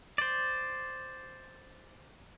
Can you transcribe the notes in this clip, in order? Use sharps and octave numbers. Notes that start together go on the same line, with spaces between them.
C5 D5